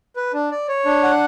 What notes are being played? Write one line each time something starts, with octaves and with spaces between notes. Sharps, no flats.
B4
D4
D5
C#5
D4
F#5